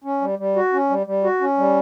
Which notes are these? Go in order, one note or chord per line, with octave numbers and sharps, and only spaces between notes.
C#4
G3
G3
F#4
C#4
G3
G3
F#4
C#4
G3